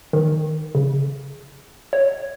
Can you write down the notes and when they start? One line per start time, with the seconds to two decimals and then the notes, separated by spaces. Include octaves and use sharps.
0.13 D#3
0.75 C#3
1.93 C#5